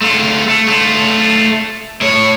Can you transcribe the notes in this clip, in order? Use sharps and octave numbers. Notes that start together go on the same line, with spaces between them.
A3 F4
A3
A3 F4
A2 C#5